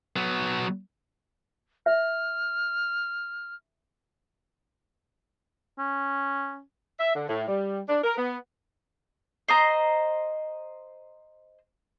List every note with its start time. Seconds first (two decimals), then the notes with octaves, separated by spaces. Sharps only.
0.16 F#3 B3
1.86 E5 F6
5.79 C#4
7.00 E5
7.15 D3
7.29 A2
7.48 G3
7.89 D4
8.04 A#4
8.17 B3
9.48 C5 D#5 A#5